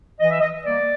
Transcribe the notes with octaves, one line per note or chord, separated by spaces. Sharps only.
E3 D#5
E5
D#5
G3 A#3 D5